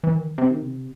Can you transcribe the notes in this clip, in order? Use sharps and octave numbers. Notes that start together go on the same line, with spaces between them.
E3
D#3
C3
D#3
C3